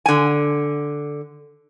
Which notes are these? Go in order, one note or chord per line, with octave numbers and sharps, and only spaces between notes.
D3 G#5